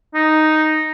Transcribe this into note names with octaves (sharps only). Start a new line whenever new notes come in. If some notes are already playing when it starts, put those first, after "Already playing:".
D#4